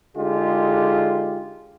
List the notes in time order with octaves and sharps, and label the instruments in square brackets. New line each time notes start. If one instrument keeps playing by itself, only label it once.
[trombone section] D3 G#3 D#4 F4 G4 G#4